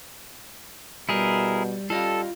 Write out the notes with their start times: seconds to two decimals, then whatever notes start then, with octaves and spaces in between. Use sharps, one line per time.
1.09 B2 G3 E4 G#4 A#4
1.90 G3 F4 A4 D#5 F5